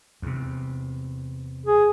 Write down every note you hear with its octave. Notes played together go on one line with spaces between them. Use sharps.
E2 C3
G#4